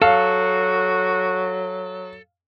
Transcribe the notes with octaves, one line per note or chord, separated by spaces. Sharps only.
F#3 F#4 A4 F5